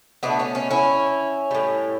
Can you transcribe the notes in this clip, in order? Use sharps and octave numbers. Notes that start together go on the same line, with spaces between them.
B2 A3 B3 D4
C#4
C#4
C#4 E4
A2 G3